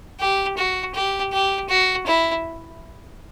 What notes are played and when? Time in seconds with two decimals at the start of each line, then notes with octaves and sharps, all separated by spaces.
0.20 G4
0.57 F#4
0.95 G4
1.33 G4
1.69 F#4
2.07 E4